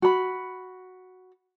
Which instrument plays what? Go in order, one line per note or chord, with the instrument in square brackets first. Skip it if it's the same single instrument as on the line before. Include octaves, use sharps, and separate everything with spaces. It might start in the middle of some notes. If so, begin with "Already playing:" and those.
[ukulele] F#4 B5